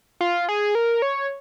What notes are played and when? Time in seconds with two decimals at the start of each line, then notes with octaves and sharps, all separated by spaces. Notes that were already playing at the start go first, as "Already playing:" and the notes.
0.21 F4
0.49 G#4
0.75 A#4
1.02 C#5